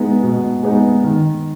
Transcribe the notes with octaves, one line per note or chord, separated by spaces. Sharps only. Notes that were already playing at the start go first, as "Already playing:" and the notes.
Already playing: B2 G#3 B3 D#4
B2
G#3 B3 D#4
D#3